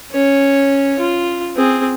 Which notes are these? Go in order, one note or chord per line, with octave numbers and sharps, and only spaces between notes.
C#4 C#5
F4
C4 G#4